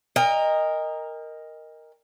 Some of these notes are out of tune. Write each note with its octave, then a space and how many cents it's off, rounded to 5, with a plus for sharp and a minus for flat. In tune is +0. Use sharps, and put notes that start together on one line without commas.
A#4 +0 D#5 +0 G5 +45